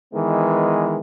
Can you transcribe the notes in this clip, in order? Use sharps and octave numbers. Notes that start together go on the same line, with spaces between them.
D#3 E3 G#3 B3